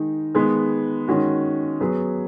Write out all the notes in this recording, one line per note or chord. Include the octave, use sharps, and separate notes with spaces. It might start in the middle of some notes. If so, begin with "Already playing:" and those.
Already playing: D#3 G#3 D#4
D#3 G#3 B3 G#4 B4
D#3 G#3 C#4 F#4
F#3 B3 G#4 B4